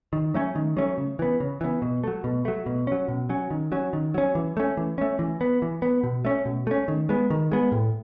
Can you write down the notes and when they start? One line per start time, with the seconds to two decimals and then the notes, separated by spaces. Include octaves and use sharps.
0.13 D#3
0.34 F#3 A3 C#4
0.55 D#3
0.77 F#3 A3 C#4
0.98 C#3
1.19 E3 B3
1.40 C#3
1.61 E3 B3
1.82 B2
2.04 F#3 A3
2.24 B2
2.45 F#3 A3
2.66 B2
2.87 F#3 C#4
3.08 B2
3.29 F#3 C#4
3.51 D#3
3.72 F#3 C#4
3.93 D#3
4.14 F#3 C#4
4.35 E3
4.57 A3 C#4
4.77 E3
4.98 A3 C#4
5.19 E3
5.41 B3
5.62 E3
5.82 B3
6.03 B2
6.25 A3 C#4
6.45 B2
6.67 A3 C#4
6.88 D#3
7.09 G#3 B3
7.30 D#3
7.52 G#3 B3
7.72 A2